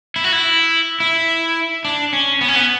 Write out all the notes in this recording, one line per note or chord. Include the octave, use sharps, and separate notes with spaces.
E4
F#4
E4
E4
D4
C#4
B3
C#4
B3